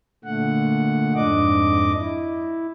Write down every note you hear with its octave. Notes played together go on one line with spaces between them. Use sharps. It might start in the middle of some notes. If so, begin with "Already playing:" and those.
A#2 D3 A3 F#5
F2 G#2 D4 D#5 D6
E4